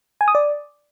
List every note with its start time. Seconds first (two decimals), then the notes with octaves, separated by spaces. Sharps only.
0.21 G#5
0.28 D#6
0.35 D5